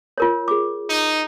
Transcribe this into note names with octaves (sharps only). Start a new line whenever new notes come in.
F4 A#4 C#5
G#4 D6
D#4